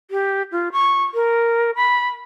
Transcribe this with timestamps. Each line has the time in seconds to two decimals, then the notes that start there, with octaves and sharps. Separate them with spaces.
0.11 G4
0.52 F4
0.72 C#6
1.14 A#4
1.76 B5